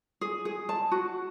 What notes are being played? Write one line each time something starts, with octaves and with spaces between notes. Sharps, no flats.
G#4
G#4
A5
F#4